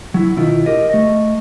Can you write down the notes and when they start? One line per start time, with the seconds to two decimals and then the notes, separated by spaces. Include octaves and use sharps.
0.14 F#3 E4
0.36 B2 D#3 E4 F4
0.66 D2 G4 A#4 D#5
0.90 A3 D#5